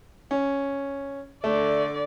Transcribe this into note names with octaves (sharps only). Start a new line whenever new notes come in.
C#4
D3 A3 D5